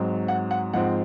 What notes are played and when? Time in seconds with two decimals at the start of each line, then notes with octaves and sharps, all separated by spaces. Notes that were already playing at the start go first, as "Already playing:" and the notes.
Already playing: G#2 F#3 C4
0.28 F#5
0.51 F#5
0.73 G#2 F3 C4 F#5